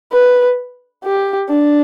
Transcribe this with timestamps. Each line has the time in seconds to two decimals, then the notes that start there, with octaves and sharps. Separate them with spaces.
0.12 B4
1.04 G4
1.49 D4